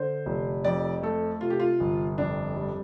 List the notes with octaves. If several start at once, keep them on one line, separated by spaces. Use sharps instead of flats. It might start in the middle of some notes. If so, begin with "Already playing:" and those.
Already playing: D3 C5
F1
F2 D5
A3 A4
C3 F4
G4
F4
G1
F2 D4
G3